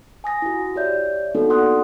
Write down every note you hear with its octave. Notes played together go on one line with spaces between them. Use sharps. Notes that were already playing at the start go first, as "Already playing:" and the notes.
G#5 D#6 A#6
E4 F#4
G4 C#5 D5 E5 G6
A#3 B3 D4 D#4 F#4 A4
D#4 D5 F#5 C6 D#6 F#6